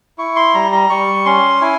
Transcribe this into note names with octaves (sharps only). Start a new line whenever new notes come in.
E4 C#6
C6
G3 A#5
A#5
G3 C#6
C#4 C6
E4 G#5